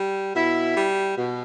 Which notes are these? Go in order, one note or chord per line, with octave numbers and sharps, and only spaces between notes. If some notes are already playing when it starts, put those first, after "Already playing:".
Already playing: G3
B2 E4
G3
B2